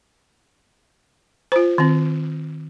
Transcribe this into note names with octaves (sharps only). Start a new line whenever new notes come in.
F4 C5
D#3 C4